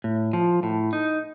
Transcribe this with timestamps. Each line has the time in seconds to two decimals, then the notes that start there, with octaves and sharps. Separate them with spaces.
0.04 A2
0.33 F3
0.63 A2
0.93 D#4